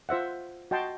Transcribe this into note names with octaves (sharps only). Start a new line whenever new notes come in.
F4 C5 E5 F#5
F#4 D#5 G5 A5 C6